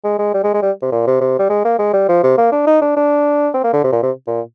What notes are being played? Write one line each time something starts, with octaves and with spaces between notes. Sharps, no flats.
G#3
G#3
G3
G#3
G#3
G3
C3
A#2
C3
C3
G3
G#3
A#3
G#3
G3
F3
C3
A#3
D4
D#4
D4
D4
C4
A#3
D3
C3
A#2
C3
A#2